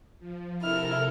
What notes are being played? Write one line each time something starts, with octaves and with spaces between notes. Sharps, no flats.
F3
C3 E4 A4 A#4 F6